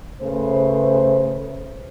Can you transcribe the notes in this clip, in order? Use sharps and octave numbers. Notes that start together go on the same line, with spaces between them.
C#3 A3 B4 C5